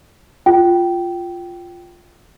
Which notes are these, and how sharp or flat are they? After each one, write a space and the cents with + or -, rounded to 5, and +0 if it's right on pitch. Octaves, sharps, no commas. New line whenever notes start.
F4 +0 G5 -15